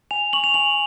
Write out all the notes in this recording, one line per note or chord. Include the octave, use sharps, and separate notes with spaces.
G#5 F7
C#6 F#7
F7
G#5 F#7